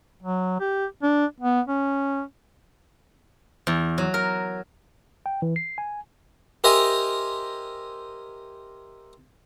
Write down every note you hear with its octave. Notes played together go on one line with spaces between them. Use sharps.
F#3
G4
D4
B3
C#4
E2
F#3
A#4
G5
E3
C7
G#5
G4 A#4 C5 D#5 E5 G#5